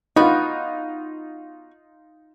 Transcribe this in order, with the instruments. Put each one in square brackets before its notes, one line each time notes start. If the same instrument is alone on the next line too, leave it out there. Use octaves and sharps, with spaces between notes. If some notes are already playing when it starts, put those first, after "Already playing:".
[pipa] B3 F#4 [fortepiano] D#4 F4